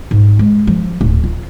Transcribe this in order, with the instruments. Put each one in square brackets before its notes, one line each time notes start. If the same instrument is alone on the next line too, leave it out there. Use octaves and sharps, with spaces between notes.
[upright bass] G#2
G#3
F3
D1
F4